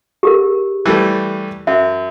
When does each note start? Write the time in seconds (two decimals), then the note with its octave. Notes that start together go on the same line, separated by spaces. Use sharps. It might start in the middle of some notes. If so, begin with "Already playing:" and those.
0.23 G4 G#4 A#4
0.86 E3 G3 A3
1.67 F#2 E5